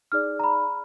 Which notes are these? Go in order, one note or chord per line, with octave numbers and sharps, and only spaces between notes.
D#4 G#4 D5 F6
A#5
B5